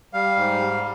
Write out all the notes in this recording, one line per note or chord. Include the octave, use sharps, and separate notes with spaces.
G3 F5
G#2
G3